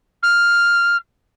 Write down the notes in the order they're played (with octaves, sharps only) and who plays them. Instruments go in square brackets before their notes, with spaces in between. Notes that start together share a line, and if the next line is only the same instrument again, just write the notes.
[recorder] F6